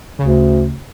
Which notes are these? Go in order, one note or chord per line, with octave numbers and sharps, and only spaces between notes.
D2 C#3